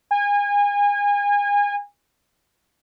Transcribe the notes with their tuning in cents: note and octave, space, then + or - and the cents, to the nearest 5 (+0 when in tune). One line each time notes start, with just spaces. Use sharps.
G#5 -30